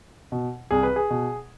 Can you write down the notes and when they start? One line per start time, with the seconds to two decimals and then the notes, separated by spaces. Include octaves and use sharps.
0.32 B2
0.71 C2 G#4
0.83 B4
0.96 G#4
1.10 B2